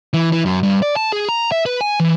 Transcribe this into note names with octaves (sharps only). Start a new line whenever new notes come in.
E3
E3
F#2
G2
D5
A5
G#4
A#5
E5
B4
G#5
E3